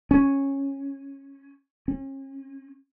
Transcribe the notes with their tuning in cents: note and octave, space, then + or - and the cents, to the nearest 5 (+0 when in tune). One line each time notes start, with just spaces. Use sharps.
C#4 -10
C#4 -40